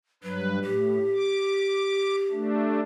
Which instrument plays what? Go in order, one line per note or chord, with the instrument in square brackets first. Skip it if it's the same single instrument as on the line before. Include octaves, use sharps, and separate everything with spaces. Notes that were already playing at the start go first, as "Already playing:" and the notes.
[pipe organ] G2 B4 [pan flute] F#3
[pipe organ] A2 [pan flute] G4
[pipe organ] D6
A3 D4